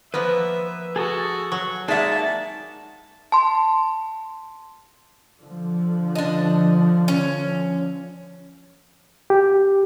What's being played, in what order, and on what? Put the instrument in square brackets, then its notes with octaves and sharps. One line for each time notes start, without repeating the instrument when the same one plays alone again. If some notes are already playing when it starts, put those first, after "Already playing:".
[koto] F3 A#3 B3 [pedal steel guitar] B4 [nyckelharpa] E5
[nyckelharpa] F#4 [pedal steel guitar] G#4 A4 D#6
[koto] F#3 [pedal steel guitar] C#6
[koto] G#3 A#3 [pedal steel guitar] D#4 G#4 [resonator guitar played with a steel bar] D5 E5 F#5 [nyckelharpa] A5
[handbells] A5 C6
[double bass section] D3 F3
[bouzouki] D4 D#5
C#4
[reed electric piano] G4